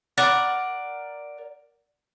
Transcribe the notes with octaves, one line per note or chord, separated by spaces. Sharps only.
A#4 D5 F#5